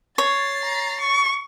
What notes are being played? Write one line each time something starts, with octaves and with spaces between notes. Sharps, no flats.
C#5 A6 C7
A#5
C#6